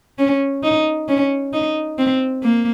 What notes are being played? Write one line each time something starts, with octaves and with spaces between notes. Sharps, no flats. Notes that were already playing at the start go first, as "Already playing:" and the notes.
C#4
D#4
C#4
D#4
C4
A#3